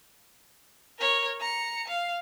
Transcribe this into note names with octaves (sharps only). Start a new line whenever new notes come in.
A#4 C#5
A#5 C#7
F5